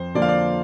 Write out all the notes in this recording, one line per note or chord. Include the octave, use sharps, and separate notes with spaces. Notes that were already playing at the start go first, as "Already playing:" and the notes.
Already playing: F2 C5
D3 F3 A#3 D5
F5
D5